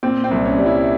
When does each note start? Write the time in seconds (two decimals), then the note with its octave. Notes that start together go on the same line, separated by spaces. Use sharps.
0.03 A#2 C4
0.24 C4
0.31 C2
0.45 C#4
0.58 G3
0.66 E4